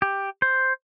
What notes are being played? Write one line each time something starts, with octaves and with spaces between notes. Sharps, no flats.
G4
C5